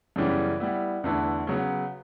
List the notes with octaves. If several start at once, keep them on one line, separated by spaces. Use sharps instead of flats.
F#2 C#3 E3 G3 B3
G3 B3 E4
E2 D3 A3 E4 B4
C#3 F#3 B3